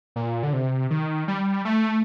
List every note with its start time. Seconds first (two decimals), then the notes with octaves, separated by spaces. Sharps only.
0.16 A#2
0.43 D3
0.53 C3
0.90 D#3
1.28 G3
1.65 A3